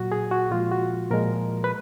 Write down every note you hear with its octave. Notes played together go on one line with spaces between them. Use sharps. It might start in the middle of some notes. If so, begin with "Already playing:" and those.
Already playing: A#2 F#3 F#4
G#4
F#4
A#2 F3 G#3 F4
F#4
A#2 F3 G#3 A#4
B4